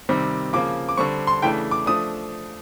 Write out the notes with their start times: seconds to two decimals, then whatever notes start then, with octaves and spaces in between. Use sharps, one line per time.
0.09 C3 D#3 G3 C4
0.53 C#3 F3 A#3 D6
0.89 D6
0.97 D3 G3 C4 C#6
1.27 C6
1.42 C#3 E3 A3 D4 G5
1.71 D6
1.86 F3 A3 D4 D#6